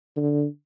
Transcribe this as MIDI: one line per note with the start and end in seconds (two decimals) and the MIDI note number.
0.16 0.45 50